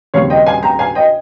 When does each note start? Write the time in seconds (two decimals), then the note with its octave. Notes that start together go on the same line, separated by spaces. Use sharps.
0.14 D#2 C#3 G3 C4 C#5 F5
0.30 D#5 G5
0.46 F5 G#5
0.63 G5 A#5
0.79 F5 G#5
0.95 D#5 G5